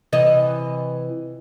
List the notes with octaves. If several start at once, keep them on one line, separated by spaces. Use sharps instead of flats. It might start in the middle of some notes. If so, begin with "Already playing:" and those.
C3 E3 D#5